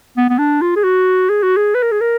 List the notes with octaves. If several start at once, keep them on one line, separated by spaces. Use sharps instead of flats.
B3
B3
D4
F4
G#4
F#4
G#4
F#4
G#4
B4
A#4
G#4
A#4